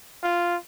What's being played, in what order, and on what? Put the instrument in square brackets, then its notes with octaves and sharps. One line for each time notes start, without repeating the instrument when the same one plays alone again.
[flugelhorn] F4